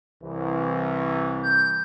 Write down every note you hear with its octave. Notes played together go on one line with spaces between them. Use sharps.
C2 E3
G6